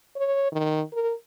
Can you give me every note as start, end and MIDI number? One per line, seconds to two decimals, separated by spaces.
0.16 0.49 73
0.52 0.82 51
0.93 1.13 70